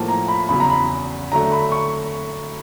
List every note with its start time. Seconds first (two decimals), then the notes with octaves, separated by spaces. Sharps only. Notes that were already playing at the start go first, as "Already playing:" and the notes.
Already playing: A2 F3 A#3 A5
0.08 A#5
0.28 B5
0.49 E2 C#3 F#3 B5
0.60 A#5
0.70 B5
1.32 D3 F#3 A3 A#5
1.52 B5
1.72 C#6